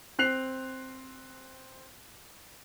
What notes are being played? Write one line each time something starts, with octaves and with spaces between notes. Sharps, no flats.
C4 F#6 C7 F7